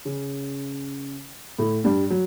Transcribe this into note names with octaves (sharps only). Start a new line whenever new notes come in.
C#3 C#4
A2 A3
G2 G3
F#3